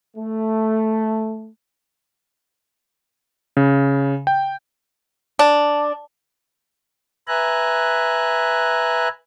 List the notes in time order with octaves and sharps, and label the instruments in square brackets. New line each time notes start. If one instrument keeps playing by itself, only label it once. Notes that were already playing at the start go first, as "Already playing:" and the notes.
[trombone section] A3
[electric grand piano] C#3
G5
[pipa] D4
[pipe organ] B4 E5 G#5 A#5 F#6